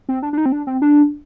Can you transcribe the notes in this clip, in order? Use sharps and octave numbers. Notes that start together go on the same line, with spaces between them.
C4
D4
D4
D#4
C4
D4
C4
D4